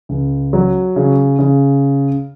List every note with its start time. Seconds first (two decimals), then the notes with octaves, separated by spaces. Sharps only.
0.09 C#2
0.53 F#3
0.96 C#3
1.39 C#3